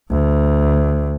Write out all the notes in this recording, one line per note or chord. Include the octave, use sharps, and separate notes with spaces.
D2